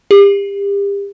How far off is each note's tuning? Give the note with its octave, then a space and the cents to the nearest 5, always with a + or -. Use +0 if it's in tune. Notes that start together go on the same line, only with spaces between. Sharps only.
G4 +35